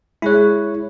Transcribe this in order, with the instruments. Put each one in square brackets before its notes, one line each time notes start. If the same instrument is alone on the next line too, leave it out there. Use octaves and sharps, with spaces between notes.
[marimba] G#3 G#4 F#6 [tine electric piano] E4 C#5